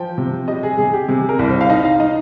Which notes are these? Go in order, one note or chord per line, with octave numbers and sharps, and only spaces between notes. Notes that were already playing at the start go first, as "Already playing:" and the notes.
Already playing: F3 G5
C3
G3 D#5
G#4
C3 G#4
G4
C3 G#4
A#4
C2
C5
F5
D#4 D#5
F5
D#4 D#5